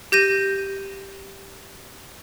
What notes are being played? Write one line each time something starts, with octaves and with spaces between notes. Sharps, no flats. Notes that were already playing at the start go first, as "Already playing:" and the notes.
G4 G6 A#6 D#7